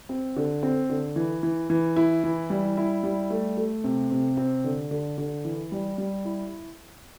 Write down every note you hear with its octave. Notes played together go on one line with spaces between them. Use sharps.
C4
D3
C4
D3
E3
E3
E3
E4
E3
G3
E4
G3
A3
A3
C3
C3
C4
D3
D3
D3
E3
G3
G3
E4